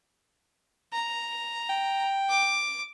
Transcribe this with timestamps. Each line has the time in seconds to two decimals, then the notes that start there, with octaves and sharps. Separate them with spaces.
0.93 A#5
1.70 G5
2.29 D6